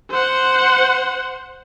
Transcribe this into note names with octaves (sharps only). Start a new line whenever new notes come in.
C5 F#5